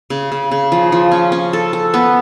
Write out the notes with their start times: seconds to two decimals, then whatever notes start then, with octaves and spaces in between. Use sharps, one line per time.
0.10 C#3
0.32 C#3
0.51 C#3
0.72 F3
0.92 F3
1.12 C#4
1.32 C#4
1.53 A4
1.73 A4
1.94 B3